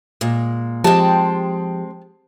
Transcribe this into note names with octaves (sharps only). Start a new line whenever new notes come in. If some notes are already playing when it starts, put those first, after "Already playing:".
A#2 G#3
F3 G#3 C4 G4 G5 A5